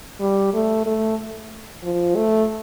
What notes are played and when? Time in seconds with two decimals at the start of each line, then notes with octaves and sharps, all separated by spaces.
0.20 G3
0.54 A3
0.86 A3
1.84 F3
2.16 A3